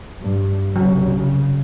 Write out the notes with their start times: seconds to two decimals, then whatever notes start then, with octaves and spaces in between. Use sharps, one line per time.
0.20 G2
0.76 C2 C#3 F#3
1.13 C#3